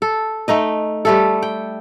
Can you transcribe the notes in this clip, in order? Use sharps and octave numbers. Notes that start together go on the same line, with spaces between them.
A4
A3 D#4 D#5
G3 A3 A4
G5